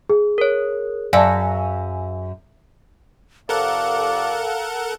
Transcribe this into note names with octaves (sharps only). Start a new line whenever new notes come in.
G#4
A#4 C#5
F#2 D5 F5 G#5 A5 E6
F2 C3 A4 A#4 D5 F5 F#5